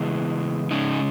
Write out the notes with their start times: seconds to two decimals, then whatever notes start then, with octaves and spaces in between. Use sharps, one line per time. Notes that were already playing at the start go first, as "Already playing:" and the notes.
Already playing: C#3 E3 G#3 B3 E4
0.71 C#3 G#3 C#4 D#4